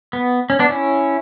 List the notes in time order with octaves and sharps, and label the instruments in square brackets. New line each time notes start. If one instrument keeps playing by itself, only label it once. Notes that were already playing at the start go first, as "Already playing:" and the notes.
[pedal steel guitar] B3
C#4
B3 D4
C#4 E4